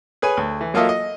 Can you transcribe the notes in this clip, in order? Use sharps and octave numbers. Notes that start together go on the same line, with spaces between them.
G#4 B4 C#5 G#5
D2
E3
F#3 A#3 F4 A4 D#5 E5
D#5